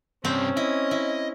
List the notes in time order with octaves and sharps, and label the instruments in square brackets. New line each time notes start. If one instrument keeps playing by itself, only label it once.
[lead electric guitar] G2 C3 [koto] C4 [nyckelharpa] C#4
[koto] E4 [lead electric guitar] D#5
[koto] E4